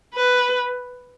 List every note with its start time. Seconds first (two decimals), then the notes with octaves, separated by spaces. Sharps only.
0.15 B4